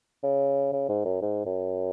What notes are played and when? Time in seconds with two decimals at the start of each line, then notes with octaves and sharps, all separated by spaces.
0.23 C#3
0.73 C#3
0.89 G#2
1.05 F#2
1.22 G#2
1.45 F#2